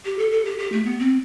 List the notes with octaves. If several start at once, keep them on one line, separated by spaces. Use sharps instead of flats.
G4
A4
A4
G4
G4
A3
B3
C4